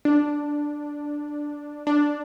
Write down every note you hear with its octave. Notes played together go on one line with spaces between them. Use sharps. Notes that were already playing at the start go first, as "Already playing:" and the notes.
D4
D4